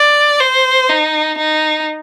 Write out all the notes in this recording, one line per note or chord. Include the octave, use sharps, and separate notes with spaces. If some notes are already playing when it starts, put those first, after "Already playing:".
Already playing: D5
C5
D#4
D#4